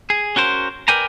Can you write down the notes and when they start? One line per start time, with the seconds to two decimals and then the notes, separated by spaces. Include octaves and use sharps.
0.10 G#4
0.36 C#4 F#4 A#4 C5
0.88 A#4 B4 D5 G5 G#5 A#5